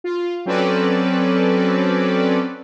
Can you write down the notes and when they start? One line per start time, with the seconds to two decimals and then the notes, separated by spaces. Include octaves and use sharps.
0.04 F4
0.46 F#3 C4 C#4 A4 B4 D5